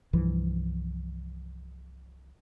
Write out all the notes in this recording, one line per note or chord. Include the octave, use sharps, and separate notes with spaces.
C2 G2 E3 F3